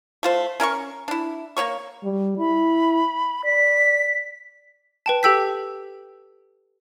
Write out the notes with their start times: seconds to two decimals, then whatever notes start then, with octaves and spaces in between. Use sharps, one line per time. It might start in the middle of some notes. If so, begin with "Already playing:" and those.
0.23 A3 F4 C5
0.60 C#4 A#4 F5 C#6
1.08 D4 E4
1.57 A#3 E4 C#5 C#6
2.04 G3
2.39 E4 B5
3.45 D5 B6
5.06 B4 G5 A5
5.23 G4 A4 G5 E6 G6 B6